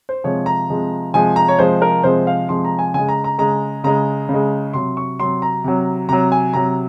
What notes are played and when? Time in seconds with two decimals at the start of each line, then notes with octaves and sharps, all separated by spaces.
0.09 C5
0.24 C3 F3 G#3 C#5
0.46 A#5
0.70 C3 F3 G#3
1.14 C3 F3 G#3 G#5
1.36 A#5
1.48 C#5
1.59 C3 F3 G#3 C5
1.82 A#4
2.04 C3 F3 G#3 C5
2.27 F5
2.49 C3 F3 G#3 C6
2.65 A#5
2.79 G#5
2.94 C#3 G#3 G#5
3.09 A#5
3.24 A#5
3.38 C#3 G#3 A#5
3.84 C#3 G#3 A#5
4.29 C#3 G#3
4.73 C3 F#3 C6
4.97 C#6
5.20 C3 F#3 C6
5.42 A#5
5.64 C3 F#3
6.09 C3 F#3 A#5
6.32 G#5
6.53 C3 F#3 A#5